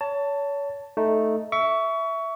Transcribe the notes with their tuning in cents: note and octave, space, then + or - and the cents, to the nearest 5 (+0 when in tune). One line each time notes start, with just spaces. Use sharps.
C#5 +30 A5 +15
A3 +0 D#4 +0
E5 +0 C#6 +25